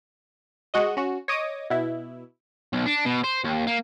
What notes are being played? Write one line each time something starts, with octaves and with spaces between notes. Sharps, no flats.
G#3 F#4 D#5
C#4 F#4
C#5 D#5 D6 D#6
B2 E4
B1
D4
B2
C5
D#2
A#3